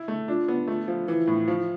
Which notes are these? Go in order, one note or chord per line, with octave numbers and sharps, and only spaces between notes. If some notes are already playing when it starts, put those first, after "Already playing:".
Already playing: E4
A3
D4 F4
B3
A3
F3
E3 E4
A2
F3